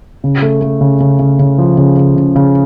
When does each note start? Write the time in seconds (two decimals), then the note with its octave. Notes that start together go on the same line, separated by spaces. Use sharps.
0.24 C#3
0.42 A3
0.61 A3
0.81 C#3
1.00 C#3
1.19 C#3
1.39 C#3
1.58 F3
1.78 C#3
1.97 C#3
2.16 C#3
2.36 C#3